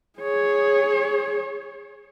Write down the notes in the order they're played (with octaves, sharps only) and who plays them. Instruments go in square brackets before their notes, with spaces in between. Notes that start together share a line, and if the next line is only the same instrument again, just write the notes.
[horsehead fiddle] G#4 C#5